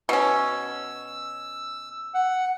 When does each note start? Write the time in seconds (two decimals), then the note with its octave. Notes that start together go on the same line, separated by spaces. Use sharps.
0.09 B2 C#4 E6
2.14 F#5